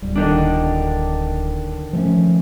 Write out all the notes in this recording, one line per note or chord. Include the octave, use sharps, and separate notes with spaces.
D1 G3
D3 D#3 D4
F3 A3 C#4